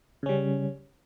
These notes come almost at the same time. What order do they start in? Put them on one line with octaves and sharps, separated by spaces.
C#3 C#4 G3